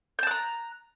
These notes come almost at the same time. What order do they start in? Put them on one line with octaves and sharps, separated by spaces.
G6 A5 F#6 A#5